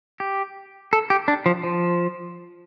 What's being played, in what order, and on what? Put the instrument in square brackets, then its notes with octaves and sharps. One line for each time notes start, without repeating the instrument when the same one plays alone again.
[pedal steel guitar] G4
A4
G4
D4
F3
F3